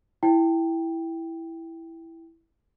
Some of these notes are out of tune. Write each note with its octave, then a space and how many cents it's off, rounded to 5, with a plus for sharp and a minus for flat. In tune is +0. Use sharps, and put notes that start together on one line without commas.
E4 +0 G5 +5